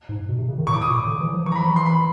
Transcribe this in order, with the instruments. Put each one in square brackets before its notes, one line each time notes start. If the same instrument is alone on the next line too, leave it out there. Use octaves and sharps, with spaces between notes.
[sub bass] G#2
B2
C3
C#3
D#3
[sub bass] A2 [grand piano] C#6
[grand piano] D6
D#6
[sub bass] A#2
[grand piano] D6
[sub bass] D3
E3
F3
[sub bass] E3 [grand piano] C#6
[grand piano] A#5
[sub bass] F3 [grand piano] B5
[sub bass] E3 [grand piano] A#5
[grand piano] C6
B5